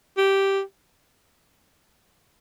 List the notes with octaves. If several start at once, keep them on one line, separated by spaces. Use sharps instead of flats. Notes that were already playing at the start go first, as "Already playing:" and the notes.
G4